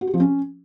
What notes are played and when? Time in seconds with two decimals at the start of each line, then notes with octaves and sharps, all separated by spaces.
0.01 F#4
0.07 G4
0.14 F3
0.20 C#4